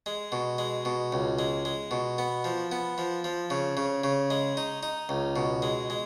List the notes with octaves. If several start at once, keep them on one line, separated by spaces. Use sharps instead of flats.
G#3
B2
G#3
B2
C#2
G#3
G#3
B2
B3
F3
B3
F3
F3
C#3
C#3
C#3
G#3
D#4
D#4
C#2
B2
G#3
G#3